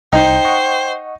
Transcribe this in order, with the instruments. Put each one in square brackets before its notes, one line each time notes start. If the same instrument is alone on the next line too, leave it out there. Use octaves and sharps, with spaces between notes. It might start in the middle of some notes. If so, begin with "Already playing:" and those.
[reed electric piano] C2 [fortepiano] D#4 [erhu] C5 [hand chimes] G5
[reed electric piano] D#5 F#5 C#6